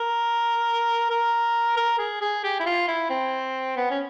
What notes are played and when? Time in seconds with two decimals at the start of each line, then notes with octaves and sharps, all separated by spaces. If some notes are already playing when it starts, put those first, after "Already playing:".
Already playing: A#4
1.10 A#4
1.77 A#4
1.99 G#4
2.21 G#4
2.44 G4
2.60 E4
2.66 F4
2.88 E4
3.10 C4
3.77 B3
3.91 C#4